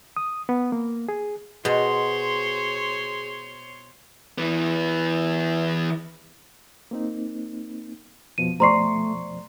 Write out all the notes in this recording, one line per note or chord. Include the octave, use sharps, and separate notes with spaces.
D#6
B3
A#3
G#4
B2 G#4 C5 C#5 C6
E3 B3
A#3 C4 D#4
F2 B2 F3 D#7
A3 C5 D5 A#5 C6 C#6 C7